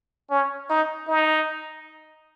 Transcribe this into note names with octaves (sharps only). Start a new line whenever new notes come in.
C#4
D#4
D#4